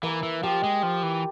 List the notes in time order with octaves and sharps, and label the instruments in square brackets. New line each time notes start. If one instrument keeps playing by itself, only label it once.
[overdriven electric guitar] E3 [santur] A#3
[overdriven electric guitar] E3
[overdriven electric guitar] F3 [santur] G4
[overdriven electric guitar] G#3
[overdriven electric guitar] F3 [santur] F4
[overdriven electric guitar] E3